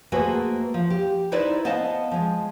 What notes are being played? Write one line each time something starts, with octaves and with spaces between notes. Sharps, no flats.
A3 A#3 F#4 G#4 B4 C5
F3
G4
D#4 E4 B4 C5 D5 E5
B3 C5 D#5 F5 A5
F3 G#3